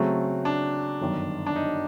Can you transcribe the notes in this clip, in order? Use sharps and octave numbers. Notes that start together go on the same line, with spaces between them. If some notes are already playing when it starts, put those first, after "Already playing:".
Already playing: C#3 F#3 A3 C4
D4
G1 F#2 D#3
D4
D#4